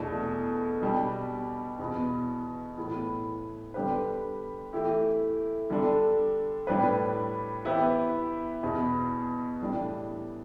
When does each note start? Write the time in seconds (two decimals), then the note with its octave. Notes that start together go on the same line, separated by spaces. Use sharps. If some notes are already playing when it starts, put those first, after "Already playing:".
Already playing: E2 B2 A3 D4 A4
0.82 B2 G3 D4 G4
1.79 E2 B2 B3
2.78 A2 E3 B3
3.74 D3 G3 D4 G4 B4
4.73 E3 A3 E4 G4
5.70 D3 G3 D4 A4
6.67 A2 G3 D4 G4 B4
7.65 E3 B3 E4 G4 B4
8.63 E2 B2 B3
9.61 A2 E3 G3 D4 G4